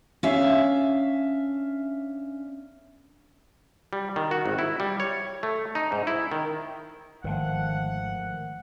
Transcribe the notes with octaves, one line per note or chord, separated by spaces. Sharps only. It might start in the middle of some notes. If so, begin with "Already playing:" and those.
C#4 D4 E5 F5
G3
D#3
F#4
G#1
E4
G3
C#5
A3
D#4
G#2
E4
D#3
G#1 D3 D#3 F3 A3 F#5